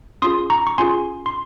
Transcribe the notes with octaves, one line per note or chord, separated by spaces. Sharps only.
C#4 F4 G#4 C6 D#6
A#5 C#6
C#6
C#4 F4 G#4 G#5 C6
C6